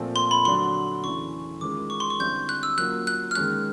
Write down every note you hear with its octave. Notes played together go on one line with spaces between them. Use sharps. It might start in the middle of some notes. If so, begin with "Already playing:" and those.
Already playing: A#2 F3 A3 C4
C6
B5
D3 F#3 A3 D4 F#4 C6
E2 C#3 E3 A3 C#6
D#3 G#3 C#4 F4 A#4 D6
C#6
C6
C#6
D3 G3 C4 E4 G6
F#6
E6
F#3 A#3 C#4 F4 F#6
F#6
F6
D#3 G#3 C#4 F#6